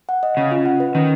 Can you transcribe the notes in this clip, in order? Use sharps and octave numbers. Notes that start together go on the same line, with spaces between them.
F#5
D#5
C#3 C#4
F4
F#5
B4
D#3 C#4